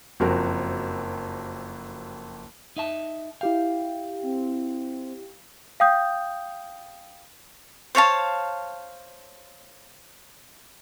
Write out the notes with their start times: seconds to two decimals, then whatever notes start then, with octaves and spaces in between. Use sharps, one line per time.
0.20 F#1 F2 C4 F#4 A#4 G5
2.77 D#4 E5 A5
3.41 E4 G4 F5 G5
4.22 C4
5.80 F5 G5 D#6 G6
7.95 C5 C#5 F5 A5